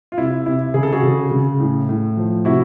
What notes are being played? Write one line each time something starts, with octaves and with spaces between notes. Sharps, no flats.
F4
C3 E4
C3 E4
C#3 G#4
A4
F#4 G#4
C#3
C#3
A2
A2
F3
C3 E4 F#4